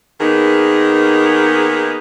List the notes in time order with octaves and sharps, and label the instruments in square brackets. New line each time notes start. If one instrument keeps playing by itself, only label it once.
[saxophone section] D#3 A#3 B3 D#4 G#4